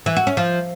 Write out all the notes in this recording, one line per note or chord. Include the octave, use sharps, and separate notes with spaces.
E3
F#4
C#4
F3